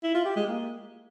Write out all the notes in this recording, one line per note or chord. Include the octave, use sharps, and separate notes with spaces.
E4
F4
G4
G#3
A#3